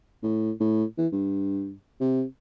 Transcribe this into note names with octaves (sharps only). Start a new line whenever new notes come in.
A2
A2
E3
G2
C3